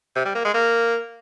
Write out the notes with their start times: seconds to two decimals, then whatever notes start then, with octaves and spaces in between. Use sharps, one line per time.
0.16 C3
0.25 G3
0.35 A#3
0.45 G#3
0.54 A#3